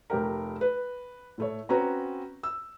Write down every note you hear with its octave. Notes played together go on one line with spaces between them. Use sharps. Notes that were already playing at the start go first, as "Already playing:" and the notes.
F1 G4 A#4
B4
A2 A3 C#5
C4 C#4 F#4 B4 A#5
E6